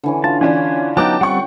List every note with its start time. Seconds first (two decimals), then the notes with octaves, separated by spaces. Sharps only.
0.04 D3 E3 C#4
0.24 F4 A5
0.41 E3 C#4 D4 G#5
0.97 F#3 B3 D#4 G5 A5 D6
1.21 G3 C4 F#5 C#6